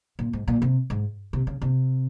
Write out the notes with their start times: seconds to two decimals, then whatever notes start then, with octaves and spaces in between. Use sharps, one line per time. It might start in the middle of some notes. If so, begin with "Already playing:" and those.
0.19 A#2
0.33 G#2
0.48 A#2
0.62 C3
0.90 G#2
1.33 C3
1.47 C#3
1.62 C3